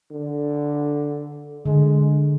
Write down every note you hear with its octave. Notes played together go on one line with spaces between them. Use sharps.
D3
D3 G#3